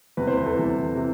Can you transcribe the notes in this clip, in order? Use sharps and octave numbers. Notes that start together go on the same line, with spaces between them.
E2 C3 E3 B4
C5
B4
A4
E2 C3 E3
C3 E3